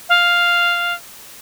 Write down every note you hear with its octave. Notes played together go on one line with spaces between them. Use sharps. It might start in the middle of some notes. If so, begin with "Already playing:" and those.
F5